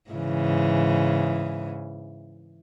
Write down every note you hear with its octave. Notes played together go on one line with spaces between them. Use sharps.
G#2 C#3 E3